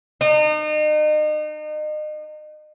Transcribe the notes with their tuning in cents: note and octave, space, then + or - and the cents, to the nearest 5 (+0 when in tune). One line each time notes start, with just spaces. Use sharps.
D#4 -35